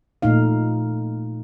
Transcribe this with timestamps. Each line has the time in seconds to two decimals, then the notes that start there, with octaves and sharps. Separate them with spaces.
0.22 A#2 A3 D#4 F5